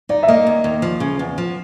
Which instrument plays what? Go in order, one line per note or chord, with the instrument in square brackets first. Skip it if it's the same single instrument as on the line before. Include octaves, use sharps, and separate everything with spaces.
[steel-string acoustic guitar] D#4 [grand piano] D5
[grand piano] E5
[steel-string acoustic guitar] A#3 [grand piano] D#5
[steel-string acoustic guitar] D#2
D#2
F3
C#3
E2
F3